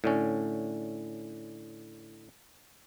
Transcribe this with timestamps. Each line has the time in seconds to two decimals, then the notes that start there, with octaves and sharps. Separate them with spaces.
0.04 A2 D3 C#4